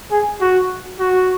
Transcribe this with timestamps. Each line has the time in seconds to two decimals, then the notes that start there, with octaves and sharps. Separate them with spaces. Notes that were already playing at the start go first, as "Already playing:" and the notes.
0.11 G#4
0.41 F#4
0.99 F#4